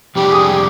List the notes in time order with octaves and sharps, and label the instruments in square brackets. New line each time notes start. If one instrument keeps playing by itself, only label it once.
[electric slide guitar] F2 C3 G3 D4 [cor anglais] G4
[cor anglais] G#4
G4